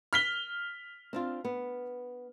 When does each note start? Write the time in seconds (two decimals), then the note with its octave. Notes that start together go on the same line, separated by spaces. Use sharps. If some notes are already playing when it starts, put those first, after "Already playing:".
0.13 F6 B6 G7
1.13 C4 D4 F4
1.45 B3